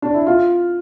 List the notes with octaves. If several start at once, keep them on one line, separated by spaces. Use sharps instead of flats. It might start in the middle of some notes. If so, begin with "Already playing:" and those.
D4
E4
F4